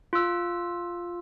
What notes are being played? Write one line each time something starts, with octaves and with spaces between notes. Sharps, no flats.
F4 E6